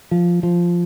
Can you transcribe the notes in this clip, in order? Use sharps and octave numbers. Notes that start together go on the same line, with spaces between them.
F3
F3